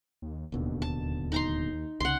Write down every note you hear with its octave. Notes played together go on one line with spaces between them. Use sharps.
D#2
D1 D#2 B2 D3
A5
D#4 A#5 C6
C2 C#3 F#5 C6